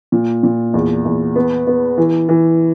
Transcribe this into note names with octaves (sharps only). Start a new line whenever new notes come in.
A#2
A#2
E2
E2
B3
B3
E3
E3